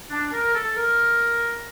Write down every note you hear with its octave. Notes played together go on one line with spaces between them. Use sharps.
D4
A#4
A4
A#4